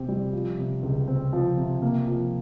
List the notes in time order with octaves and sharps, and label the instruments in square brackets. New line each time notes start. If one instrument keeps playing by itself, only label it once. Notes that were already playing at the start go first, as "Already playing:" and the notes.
Already playing: [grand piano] C3 C4 G4
G3
F3
C3
C#2
C4
F3
C3
A#3
F3